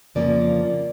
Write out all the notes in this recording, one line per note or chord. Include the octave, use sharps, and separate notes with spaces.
F2 C#3 F3 A#3 D5